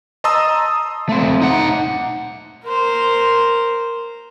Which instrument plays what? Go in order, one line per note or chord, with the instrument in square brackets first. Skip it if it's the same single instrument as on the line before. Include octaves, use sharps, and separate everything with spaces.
[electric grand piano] D#5 A5 A#5 C6 D#6 E6
[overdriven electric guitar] A3 C4
D#4 F#5
[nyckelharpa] A#4 C5